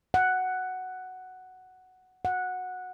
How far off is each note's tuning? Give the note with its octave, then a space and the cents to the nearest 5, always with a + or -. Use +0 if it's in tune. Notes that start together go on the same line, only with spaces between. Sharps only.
F#5 +5
F#5 -10